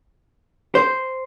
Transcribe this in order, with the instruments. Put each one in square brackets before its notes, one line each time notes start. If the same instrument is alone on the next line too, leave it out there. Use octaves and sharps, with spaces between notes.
[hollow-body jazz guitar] C5